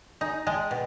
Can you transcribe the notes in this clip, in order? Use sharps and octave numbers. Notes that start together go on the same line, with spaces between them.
D#4 G#5 A#5
G#3 G5 A5
B2